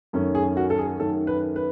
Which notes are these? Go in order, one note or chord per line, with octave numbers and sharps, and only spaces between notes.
F#2 D#3 A3 C#4
G#4
F#4
A4
G#4
F#2 D#3 A3 C#4 A4
B4
B4